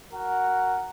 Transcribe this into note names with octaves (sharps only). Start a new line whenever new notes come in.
F#4 A#4 F#5